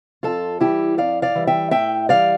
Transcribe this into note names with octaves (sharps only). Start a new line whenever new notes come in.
F2 F4 A4
E3 G3 E4 G4
F2 D5 F5
D5 F5
E3 G3
E5 G5
A2 E5 G5
E3 G3 D5 F5